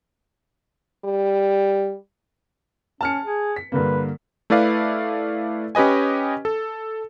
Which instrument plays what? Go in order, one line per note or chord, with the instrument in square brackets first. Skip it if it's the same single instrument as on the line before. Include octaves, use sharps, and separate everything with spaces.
[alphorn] G3
[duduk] C#4 [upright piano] A5 F6 C#7
[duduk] G#4
[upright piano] B6
[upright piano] G2 D3 A#3 [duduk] B4
[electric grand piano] A3 E4 B4 D5 F5
C#4 G4 B4 D#5 G#5
A4